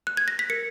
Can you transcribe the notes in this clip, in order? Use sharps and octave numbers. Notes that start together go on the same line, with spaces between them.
F#6
G#6
A#6
B6
A#4 C#7